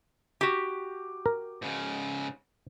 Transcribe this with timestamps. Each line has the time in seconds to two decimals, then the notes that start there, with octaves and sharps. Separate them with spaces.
0.41 F#4 G4
1.26 A#4
1.62 G#2 C#3